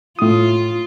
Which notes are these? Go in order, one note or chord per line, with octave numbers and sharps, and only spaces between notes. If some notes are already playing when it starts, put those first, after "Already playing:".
A2 F4 D#6